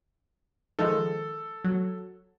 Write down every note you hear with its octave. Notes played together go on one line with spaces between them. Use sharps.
D#3 F3 G#3 A4
F#3